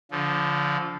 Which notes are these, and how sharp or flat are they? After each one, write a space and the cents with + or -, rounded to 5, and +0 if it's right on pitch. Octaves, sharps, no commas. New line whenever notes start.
D3 -30 F3 +0